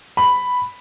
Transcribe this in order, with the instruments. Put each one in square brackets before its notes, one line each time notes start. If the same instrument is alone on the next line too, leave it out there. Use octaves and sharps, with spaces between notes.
[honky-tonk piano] B5